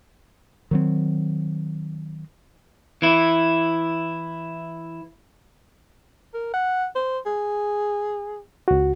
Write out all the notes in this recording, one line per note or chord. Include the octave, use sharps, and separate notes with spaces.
D#3 F#3 C4
E3 E4
A#4
F#5
C5
G#4
C#2 F#4